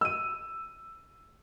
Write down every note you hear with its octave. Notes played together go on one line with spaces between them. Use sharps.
E6 D#7